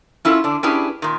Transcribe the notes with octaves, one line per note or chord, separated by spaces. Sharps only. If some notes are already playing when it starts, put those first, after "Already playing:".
C#4 E4 F4 A4
D3 D4
C#4 D4 E4 G4 G#4 B4
A#2 D#3